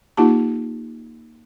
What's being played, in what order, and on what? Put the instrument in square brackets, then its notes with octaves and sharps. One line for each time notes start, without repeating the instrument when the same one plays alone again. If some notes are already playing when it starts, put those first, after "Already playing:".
[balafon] A#3 D#4 F4 G4 A5